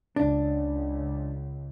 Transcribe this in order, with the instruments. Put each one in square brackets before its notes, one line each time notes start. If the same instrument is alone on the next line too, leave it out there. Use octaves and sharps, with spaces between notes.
[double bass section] C#2 [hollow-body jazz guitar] D4